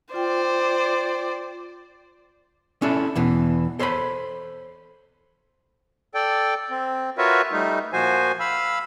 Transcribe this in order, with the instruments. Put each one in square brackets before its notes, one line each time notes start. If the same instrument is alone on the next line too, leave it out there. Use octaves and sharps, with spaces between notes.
[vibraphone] F4 G5 [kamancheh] C5 D5
[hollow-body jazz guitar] C#4 D4 E4 A4
E2 B2 E3
A4 C5 C#5 A#5 B5
[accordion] A4 D5 G5
C4
F4 F#4 A#4 B4 C#5 E5
G3 A3 D#4
A#2 F3 F#4 C5 G#5
F5 B5 E6